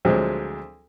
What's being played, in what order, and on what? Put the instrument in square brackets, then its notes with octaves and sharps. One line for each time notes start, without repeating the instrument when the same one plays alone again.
[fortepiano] D2 F3 F#3 G#3 C4